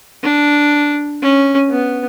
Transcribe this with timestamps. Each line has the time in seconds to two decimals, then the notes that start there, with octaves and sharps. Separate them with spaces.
0.23 D4
1.22 C#4
1.70 B3